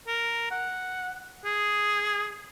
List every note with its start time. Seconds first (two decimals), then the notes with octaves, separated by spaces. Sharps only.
0.07 A#4
0.51 F#5
1.45 G#4